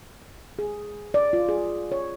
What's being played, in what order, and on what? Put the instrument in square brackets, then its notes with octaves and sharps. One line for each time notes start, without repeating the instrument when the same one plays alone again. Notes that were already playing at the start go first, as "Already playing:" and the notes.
[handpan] G#4
D5
F4
G#4
C#5